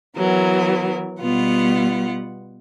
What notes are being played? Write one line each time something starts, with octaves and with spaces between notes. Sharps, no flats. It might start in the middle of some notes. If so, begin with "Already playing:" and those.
E3 F#3 B3 A#4
B2 G3 B3 F4 F#5